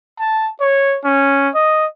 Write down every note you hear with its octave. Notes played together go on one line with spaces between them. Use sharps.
A5
C#5
C#4
D#5